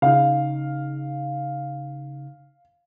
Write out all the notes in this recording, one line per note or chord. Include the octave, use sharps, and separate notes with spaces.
C#3 D#4 F5